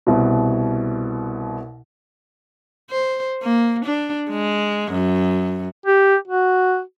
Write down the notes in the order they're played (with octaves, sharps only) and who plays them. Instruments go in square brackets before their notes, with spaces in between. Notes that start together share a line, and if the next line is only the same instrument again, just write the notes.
[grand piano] C2 B2
[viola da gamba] C5
A#3
D4
G#3
F#2
[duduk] G4
F#4